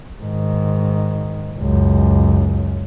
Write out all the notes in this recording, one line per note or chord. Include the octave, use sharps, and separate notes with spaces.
G#2 D#3
C#2 F#2